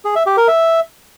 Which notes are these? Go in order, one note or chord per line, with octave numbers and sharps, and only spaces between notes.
G#4
E5
G4
A#4
E5